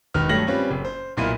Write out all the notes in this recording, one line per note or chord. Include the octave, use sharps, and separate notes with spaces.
E1 D#3 B4 F6
G2 F#3 A3 A#6 F#7
G3 C4 C#4 F4 B4
F#1
C5
B1 A#2 A#3 B3 E4 D#7